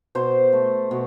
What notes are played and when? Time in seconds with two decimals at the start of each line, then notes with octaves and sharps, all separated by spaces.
0.15 B2 C5
0.53 A3
0.91 B2